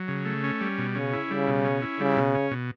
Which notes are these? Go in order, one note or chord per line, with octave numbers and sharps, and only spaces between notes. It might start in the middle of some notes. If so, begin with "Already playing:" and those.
Already playing: F#3
C#3
A3
C#4
G3
B2
C#3 C#4
E4
C#3 G3
B2
C#4
E4
C#3 G3
B2
C#4
B2